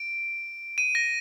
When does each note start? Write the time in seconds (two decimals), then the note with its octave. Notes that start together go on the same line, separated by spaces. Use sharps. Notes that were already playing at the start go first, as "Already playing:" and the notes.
Already playing: D7
0.78 D#7
0.95 A#6